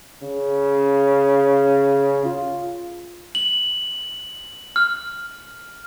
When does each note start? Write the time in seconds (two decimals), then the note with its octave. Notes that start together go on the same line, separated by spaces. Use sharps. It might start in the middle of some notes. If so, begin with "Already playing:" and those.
0.23 C#3
2.25 F4
3.35 F#7
4.76 F6